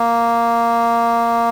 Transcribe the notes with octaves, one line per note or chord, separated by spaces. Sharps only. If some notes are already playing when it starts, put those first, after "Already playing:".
Already playing: A#3